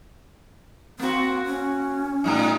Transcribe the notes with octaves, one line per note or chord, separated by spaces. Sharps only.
A#3 C4 F#4
C#4
A2 G3 D#4